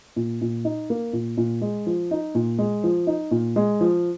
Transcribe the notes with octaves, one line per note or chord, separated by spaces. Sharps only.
A#2
A#2
D#4
A#3
A#2
A#2
G#3
F3
D#4
A#2
G#3
F3
D#4
A#2
G#3
F3